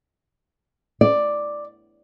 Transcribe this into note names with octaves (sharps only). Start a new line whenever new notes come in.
D5